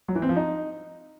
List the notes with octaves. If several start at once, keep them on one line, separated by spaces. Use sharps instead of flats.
F#3
E3
C4
F3
D#4